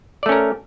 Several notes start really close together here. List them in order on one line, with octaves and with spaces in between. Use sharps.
D5 A3 C#4 A#4